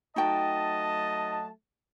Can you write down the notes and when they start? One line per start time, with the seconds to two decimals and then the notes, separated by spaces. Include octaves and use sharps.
0.16 F#3 A3 D#4 F#4 D#5 G5 A5